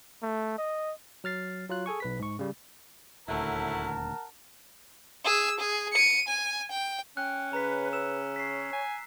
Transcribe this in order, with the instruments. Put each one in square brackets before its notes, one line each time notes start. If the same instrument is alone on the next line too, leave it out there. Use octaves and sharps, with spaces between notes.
[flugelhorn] A3
D#5
[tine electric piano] F#3 F6 A6 C7
F#3 F4 F#6
G#4 A4 G#5 C#6
B1 B4 B6
G#2 C#6
C#3 G3
[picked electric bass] D#1 D2 [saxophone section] F#3 A3 E4 [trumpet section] A#4 F#5 A5
[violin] G#4 E6
G#4
C#7 D#7
G#5
G5
[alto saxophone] C#4 [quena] G5 [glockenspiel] F#6
[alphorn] C#3 [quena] B4 [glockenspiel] A#5 B6
[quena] B4 [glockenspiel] E6 E7
[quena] C#5 [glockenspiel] B6 C7
[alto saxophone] G#5